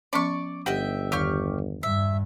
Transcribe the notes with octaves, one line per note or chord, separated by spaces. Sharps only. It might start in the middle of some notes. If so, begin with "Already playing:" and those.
F3 B3 C#4 D5 C#6
G1 G4 D#5 E5 F#5 G5
E2 D#3 G4 C#6 F6
G2 E5